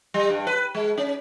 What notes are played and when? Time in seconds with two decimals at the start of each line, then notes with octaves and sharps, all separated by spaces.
0.14 G3
0.30 G2
0.47 B4
0.75 G#3
0.98 C#4